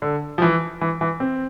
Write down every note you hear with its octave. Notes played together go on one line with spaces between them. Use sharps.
D3
F3
E3
E3
E3
C4